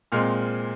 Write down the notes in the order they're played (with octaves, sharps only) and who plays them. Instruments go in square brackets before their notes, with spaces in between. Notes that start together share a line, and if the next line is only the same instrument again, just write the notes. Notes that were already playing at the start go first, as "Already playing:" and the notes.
[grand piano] A#2 G#3 C4 F6